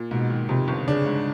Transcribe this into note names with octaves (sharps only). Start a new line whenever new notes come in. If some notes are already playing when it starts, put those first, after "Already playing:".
Already playing: A#2
G#2 B2
D#3
F2 C3
G1
C#3 D4
G#2